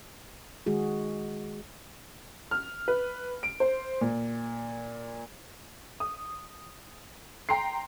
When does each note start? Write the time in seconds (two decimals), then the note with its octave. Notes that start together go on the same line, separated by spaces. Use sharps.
0.66 D#3 G#3 F#4 G#4
2.51 F6
2.88 B4
3.43 D7
3.60 C5
4.01 A#2
6.00 D#6
7.49 G5 A#5 C6 C7